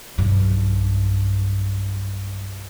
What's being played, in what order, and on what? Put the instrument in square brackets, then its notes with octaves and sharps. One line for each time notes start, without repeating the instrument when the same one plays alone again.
[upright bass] B1 G2